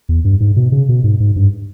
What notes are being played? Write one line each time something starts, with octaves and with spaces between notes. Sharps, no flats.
E2
G2
G#2
B2
C#3
B2
G#2
G#2
G2